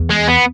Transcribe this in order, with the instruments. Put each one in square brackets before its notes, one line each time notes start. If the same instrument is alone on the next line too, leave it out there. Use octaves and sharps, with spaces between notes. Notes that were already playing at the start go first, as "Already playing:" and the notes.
Already playing: [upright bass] E2
[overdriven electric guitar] G#3
B3